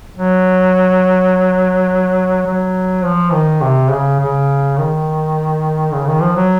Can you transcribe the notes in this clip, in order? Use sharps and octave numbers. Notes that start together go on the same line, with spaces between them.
F#3
F#3
F3
D#3
C3
C#3
C#3
D#3
C#3
D#3
F3
F#3